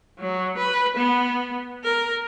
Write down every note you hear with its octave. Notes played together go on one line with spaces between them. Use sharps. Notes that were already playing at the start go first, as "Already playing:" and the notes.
F#3
B4
B3
A#4